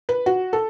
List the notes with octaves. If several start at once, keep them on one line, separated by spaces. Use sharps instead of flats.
B4
F#4
A4